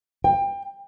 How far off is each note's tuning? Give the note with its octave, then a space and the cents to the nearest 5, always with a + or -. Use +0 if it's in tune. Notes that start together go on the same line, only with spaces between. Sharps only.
G5 +25